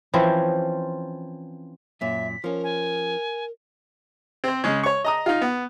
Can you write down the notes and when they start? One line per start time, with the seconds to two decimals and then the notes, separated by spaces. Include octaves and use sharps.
0.14 E3 F3 C4 C#4
2.01 F#2 A#2 E5 B6
2.44 F3 C#4 A#4
2.63 G#5
4.44 C4 C5
4.64 C#3 G#3
4.83 C#5 C#6
5.05 D#5 A#5 D#6
5.26 D#4 F4
5.42 B3